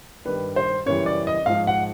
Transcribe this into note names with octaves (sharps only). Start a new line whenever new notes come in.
G2 D#3 G3 B4
C5
F#2 C#3 E3 G3 C#5
D5
D#5
G#2 F3 F5
F#5